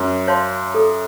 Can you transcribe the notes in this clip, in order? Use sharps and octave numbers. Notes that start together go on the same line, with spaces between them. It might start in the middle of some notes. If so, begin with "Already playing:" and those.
Already playing: F#2
C#5 F5 A5 C6
A4